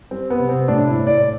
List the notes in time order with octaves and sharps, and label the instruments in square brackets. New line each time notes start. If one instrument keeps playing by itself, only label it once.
[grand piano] G3 C4
B3
C3
C4
A2 D4
E4
A2
D5